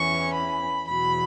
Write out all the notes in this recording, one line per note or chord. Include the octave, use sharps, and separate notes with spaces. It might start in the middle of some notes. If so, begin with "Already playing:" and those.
Already playing: E2 E3 C#4 C#6
B5
E2 B2 F#3 B5